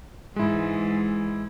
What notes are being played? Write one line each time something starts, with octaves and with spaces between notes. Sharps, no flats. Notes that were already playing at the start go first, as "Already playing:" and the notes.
G#2 E3 G#3 E4